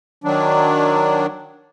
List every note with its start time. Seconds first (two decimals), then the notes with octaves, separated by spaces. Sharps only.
0.24 D#3 F#3 D4